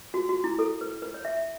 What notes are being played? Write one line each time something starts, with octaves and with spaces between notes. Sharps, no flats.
F#4
F#4
E4
A4
B4
B4
C#5
E5